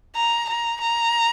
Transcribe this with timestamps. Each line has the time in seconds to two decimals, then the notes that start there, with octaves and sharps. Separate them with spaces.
0.15 A#5
0.49 A#5
0.81 A#5